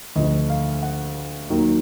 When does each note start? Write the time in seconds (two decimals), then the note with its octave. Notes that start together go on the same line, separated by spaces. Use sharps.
0.16 D2 D3 F3 D#5
0.50 F5
0.83 F#5
1.50 D#2 D#3 F#3